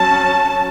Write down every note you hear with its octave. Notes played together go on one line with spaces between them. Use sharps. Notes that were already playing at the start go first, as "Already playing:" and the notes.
Already playing: F#3 C#4 A5